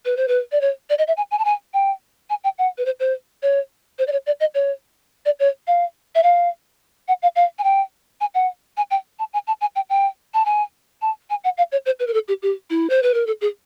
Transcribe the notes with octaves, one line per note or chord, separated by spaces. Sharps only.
B4
C5
B4
D5
C#5
D5
D#5
E5
G#5
G#5
A5
G#5
G5
G#5
G5
F#5
B4
C5
C5
C#5
C5
D5
C#5
D5
D#5
C#5
D5
C#5
F5
E5
F5
F#5
F5
F5
G#5
G5
G#5
F#5
G#5
G5
A5
G#5
A5
G#5
G5
G5
A5
G#5
A5
G#5
F#5
F5
C#5
C5
B4
A#4
A4
G4
G4
E4
C5
B4
A#4
A4
G#4